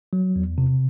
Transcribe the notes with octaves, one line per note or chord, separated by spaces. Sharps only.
F#3
E2
C3